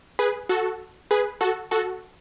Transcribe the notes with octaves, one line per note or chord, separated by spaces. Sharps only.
G#4 B4
F#4 A4
G#4 B4
F#4 A4
F#4 A4